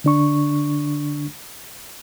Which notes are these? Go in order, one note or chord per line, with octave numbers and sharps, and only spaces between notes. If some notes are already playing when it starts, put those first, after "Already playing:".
D3 D4 C#6